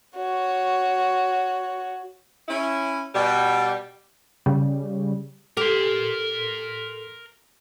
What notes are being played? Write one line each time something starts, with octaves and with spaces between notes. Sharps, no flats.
F#4 C#5
C#4 E4
B2 G3
C#3 G3
G4 A4 A#4 C6